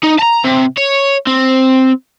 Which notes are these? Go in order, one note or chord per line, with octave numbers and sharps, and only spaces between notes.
D#4
A5 A#5
C3
C#5
C4